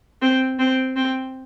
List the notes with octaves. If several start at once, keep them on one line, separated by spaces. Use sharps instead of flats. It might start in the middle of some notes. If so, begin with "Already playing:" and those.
C4
C4
C4